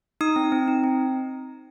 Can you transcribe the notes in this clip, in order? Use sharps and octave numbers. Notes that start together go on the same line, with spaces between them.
D#4 D#6
C4
C4
D#4
C4